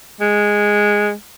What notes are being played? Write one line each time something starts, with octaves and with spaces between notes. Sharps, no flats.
G#3